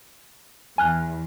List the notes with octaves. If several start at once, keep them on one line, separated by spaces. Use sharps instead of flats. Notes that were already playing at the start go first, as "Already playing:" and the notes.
E2 G#5 F6 F#6